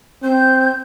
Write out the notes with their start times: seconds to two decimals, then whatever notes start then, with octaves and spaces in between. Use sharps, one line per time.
0.23 C4 G6